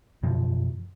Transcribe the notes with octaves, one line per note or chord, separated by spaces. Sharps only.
F#2 B2 E3 F3